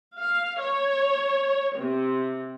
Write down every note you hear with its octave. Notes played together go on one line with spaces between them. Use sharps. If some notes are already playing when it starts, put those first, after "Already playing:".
F5
C#5
C3